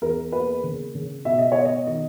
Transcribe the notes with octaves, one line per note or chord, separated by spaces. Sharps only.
E2 A#4
A#3 B4
C#3
C#3
B2 E5
D#5
B3 C#5
D#5
D#3 D#5